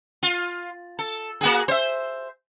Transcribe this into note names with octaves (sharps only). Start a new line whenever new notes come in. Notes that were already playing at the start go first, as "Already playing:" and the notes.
F4
A4
A#3 F#4 G#4
C5 E5